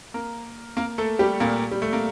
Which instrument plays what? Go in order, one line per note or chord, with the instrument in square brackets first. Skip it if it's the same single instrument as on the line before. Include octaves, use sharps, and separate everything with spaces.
[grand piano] A#3 A#4
A#3 A#4
A3 A4
G3 G4
A#2 A#3
G3
A3
A#3